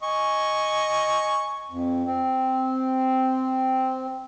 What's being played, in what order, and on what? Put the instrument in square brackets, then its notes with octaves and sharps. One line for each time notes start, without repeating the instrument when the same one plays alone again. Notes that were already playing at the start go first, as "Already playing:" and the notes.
[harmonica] D#5 G#5 C#6
[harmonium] F2
C4